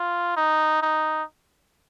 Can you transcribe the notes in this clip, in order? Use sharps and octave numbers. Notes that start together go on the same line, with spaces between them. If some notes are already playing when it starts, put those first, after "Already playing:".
Already playing: F4
D#4
D#4